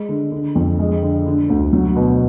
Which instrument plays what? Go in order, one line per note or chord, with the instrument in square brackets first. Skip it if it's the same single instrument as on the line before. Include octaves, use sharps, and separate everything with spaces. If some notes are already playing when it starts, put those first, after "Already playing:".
Already playing: [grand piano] G#3
D3
D3
F2
G#3
D3
D3
D2
F#3
B2